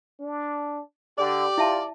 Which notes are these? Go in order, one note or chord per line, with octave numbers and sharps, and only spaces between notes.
D4
D3 G4 D5
E4 F4 E5 A5